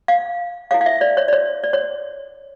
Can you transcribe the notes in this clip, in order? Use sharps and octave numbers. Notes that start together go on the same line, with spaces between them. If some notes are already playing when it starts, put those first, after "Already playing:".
F5
E4 A4 C#5 F5
F5
E5
D5
C#5
D5
C#5
D5
C#5